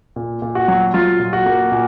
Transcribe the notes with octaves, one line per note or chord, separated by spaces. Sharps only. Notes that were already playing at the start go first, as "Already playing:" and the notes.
A#2
A#2
F#4
F#3
F#3 F4
A#2
F#4
A#3
A#2